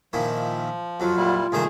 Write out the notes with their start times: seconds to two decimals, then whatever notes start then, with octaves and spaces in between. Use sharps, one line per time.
0.13 A#2 D#3 F3 E4
1.00 F2 F#3 F4
1.17 A#2 G3 E4
1.52 C2 A#2 D#3 A3 G#4 C5